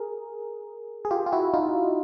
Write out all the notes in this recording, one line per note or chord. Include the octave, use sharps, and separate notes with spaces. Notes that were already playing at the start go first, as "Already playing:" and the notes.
Already playing: G#4 A#4
G#4
F4 G4
F4
E4 F#4
D#4 F4